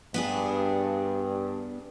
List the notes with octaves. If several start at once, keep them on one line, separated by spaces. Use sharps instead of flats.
G2 B3 D4 G#4